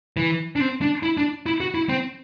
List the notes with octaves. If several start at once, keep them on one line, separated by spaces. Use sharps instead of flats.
E3
D4
C4
D4
E4
D4
E4
F#4
E4
C4